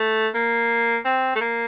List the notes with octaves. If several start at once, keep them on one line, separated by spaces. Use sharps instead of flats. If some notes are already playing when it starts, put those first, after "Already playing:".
Already playing: A3
A#3
C4
A3
A#3